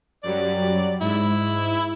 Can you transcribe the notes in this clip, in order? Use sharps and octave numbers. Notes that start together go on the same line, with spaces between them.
F#2 F#3 G3 D5
G#2 E4